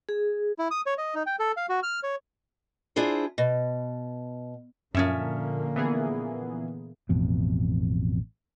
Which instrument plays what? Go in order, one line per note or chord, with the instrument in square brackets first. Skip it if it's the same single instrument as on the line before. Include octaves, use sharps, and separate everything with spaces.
[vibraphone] G#4
[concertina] E4
D#6
C#5
D#5
D#4
G5
A4
F5
F#4
F6
C#5
[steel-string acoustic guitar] D4 E4 F4 G#4 C5
B2
[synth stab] F#2 [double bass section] A#2 D3 A#3 [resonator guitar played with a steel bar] F3 C#4 E5
[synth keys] E3 B3 G#4
[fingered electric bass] A1 F2 B2